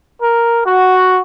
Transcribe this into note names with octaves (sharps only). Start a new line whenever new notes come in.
A#4
F#4